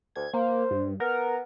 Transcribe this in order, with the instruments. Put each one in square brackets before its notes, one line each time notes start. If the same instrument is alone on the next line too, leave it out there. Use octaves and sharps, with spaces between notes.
[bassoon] D2 [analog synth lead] G#6
[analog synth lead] A#3 [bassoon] C5
[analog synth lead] G2
[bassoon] B3 [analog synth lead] A#4